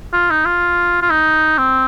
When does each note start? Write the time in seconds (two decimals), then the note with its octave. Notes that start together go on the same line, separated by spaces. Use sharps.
0.13 F4
0.30 D#4
0.45 F4
1.02 F4
1.10 D#4
1.58 C4